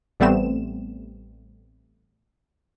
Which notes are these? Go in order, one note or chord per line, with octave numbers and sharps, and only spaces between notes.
A1 G3 A3 B3 C4 E7